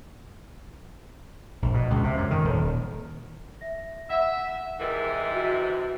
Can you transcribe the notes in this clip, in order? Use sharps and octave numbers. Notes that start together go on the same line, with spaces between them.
A#1
B2
C#2
C3
F#2
D#3
D#1
E5 A#6
E5 F#5
G#2 C3 E3 A#4
F#4